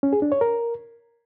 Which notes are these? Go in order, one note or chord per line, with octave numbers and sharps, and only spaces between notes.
C#4
G#4
D4
C#5
A#4